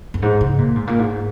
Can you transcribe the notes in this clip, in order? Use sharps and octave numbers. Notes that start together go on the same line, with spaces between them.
F#2
G#2
C#3
A#2
G#2
A#2
G#2